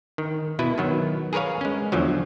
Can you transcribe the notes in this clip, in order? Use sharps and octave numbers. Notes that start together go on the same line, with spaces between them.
D#3
B2 E4 B4
D#3 F#3 B3
G#4 A#4 B4 C#5 F5
G#3 C#4
E2 D3 F3 F#3